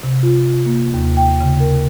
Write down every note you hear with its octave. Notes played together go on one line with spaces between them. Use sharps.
C3
F4
A#3
D#2
G5
C#3
A#4